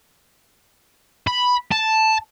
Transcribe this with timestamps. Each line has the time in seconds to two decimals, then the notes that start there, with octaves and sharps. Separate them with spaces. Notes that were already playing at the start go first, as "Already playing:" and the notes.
1.27 B5
1.71 A5